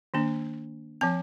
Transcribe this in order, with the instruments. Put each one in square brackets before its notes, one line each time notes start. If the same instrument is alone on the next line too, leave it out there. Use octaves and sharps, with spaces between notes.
[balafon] D#3 A#3 D4
F3 C4 A5